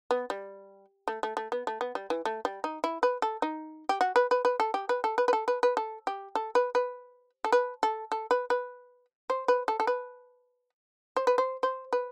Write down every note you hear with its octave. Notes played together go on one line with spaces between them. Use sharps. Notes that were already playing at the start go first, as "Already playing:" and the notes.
B3
G3
A3
A3
A3
B3
A3
B3
G3
E3
A3
G3
D#4
E4
B4
A4
D#4
G4
F#4
B4
B4
B4
A4
G4
B4
A4
B4
B4
A4
B4
B4
A4
G4
A4
B4
B4
A4
B4
A4
A4
B4
B4
C5
B4
A4
A4
B4
C5
B4
C5
C5
B4